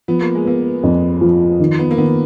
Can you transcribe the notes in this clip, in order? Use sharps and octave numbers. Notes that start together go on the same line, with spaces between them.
F3 B3
A#3
G#3
A#3 B3
F2
F3
D#3
B3
A#3
D#3 B3